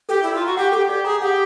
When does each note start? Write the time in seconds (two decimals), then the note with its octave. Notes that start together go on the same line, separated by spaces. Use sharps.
0.09 G4 A4
0.23 E4 D5
0.35 F4
0.41 F#4 A#5
0.57 G4 F#5
0.72 G4 A4
0.89 G4 D5
1.04 G#4 A#5
1.21 G4 F#5